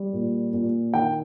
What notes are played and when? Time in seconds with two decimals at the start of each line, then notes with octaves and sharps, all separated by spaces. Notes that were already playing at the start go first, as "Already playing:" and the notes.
Already playing: G3
0.13 A#2
0.54 A#2
0.94 D#3 G5